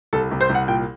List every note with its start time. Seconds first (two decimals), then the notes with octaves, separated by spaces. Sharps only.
0.13 C2 A4
0.31 C2
0.41 C5
0.49 C2
0.55 F#5
0.68 A#2 G5